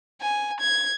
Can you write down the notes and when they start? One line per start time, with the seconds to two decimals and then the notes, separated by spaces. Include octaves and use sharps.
0.21 G#5
0.60 G#6